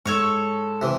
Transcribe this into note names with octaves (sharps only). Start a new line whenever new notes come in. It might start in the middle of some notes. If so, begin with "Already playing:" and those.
G#2 A4 C#5 C#6
C3 E3